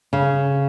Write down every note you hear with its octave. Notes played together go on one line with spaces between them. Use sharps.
C#3